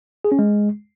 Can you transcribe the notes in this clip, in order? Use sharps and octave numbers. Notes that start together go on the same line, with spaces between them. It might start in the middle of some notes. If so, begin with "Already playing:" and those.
G#4
C#4
G#3